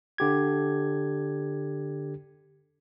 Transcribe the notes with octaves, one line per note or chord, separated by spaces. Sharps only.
D3 G4 G#6